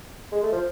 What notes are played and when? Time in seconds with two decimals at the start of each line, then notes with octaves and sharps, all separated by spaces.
0.32 G#3
0.43 A3
0.52 F3